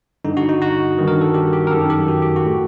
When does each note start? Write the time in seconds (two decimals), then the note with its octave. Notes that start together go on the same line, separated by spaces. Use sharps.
0.25 G2 D3 D#4
0.37 F#4
0.49 D#4
0.62 F#4
0.98 G2 D#3
1.08 A#4
1.21 A4
1.34 G4
1.53 G4
1.67 A#4
1.71 F#2 D#3 A4
1.90 G4
2.08 F#4
2.22 G4
2.36 F#4
2.45 A2